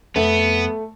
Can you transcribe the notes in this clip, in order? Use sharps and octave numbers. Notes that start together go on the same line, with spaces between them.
F2 A3 B3